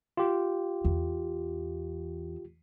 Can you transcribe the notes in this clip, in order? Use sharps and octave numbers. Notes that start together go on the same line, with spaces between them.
F4 G4
E2